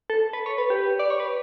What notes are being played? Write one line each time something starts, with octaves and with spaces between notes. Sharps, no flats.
A4
B4
C#5
B4
G4
D5
C#5
B4